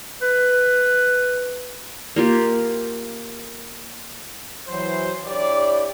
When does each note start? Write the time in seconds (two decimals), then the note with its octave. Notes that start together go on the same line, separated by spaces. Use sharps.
0.22 B4
2.16 A#3 F4 G4
4.68 E3 F#3 C5
5.27 D4 E4 G4 C#5 D5